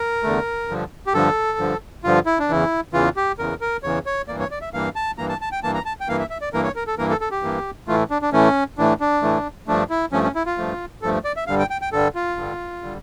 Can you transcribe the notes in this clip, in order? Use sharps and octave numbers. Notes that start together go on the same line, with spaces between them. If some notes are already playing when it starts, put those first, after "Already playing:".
Already playing: A#4
E2 D3 A3
G2 D3 F3
G4
G2 D3 F3 A4
G2 D3 F3
G2 D3 F3 F4
E4
D4
E2 C#3 E3 E4
E2 C#3 E3 F4
G4
E2 C#3 E3 A#4
A#4
E2 C#3 E3 C#5
C#5
G2 E3 A#3 D5
C#5
D5
E5
G2 E3 A#3 F5
A5
G2 E3 A#3 A#5
A5
A5
G5
G2 E3 A#3 A5
A#5
A5
G5
G2 E3 A#3 F5
E5
E5
D5
G2 E3 A#3 A#4
C#5
A#4
A4
G2 E3 A#3 A#4
A4
A4
G4
G2 E3 A#3
A2 E3 A3 F4
D4
D4
A2 E3 A3 C#4
A2 E3 A3 D4
D4
A2 E3 A3
G2 F3 A3 D4
E4
G2 F3 A3 C#4
C#4
E4
F4
G2 F3 A3
G2 F3 A3 A4
D5
E5
G2 D3 G3 F5
G5
G5
G5
G2 D3 G3 A4
F4
G2 D3 G3
D3 G3